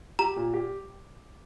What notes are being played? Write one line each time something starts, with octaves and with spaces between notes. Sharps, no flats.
G4 A#5
A#2
G4